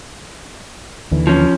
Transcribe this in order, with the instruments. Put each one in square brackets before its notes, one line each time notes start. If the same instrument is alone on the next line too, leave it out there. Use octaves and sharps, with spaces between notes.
[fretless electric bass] D#2 D3 E3
[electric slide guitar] F3 C#4